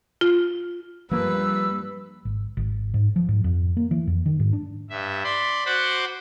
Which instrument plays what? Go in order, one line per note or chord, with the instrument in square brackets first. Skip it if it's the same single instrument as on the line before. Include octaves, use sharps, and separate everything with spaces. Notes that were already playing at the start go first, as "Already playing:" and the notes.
[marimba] F4
[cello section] G2 G3 [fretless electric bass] F3 A#3 [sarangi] B4 [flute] E6
[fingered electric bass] G#1
G#1
G#2
F3
G#2
F2
A#3
E3
F2
D#3
G#2
D4
[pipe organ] G2 E5
D5 B5 C6
F#4 C5 F#5 B5 C6 D6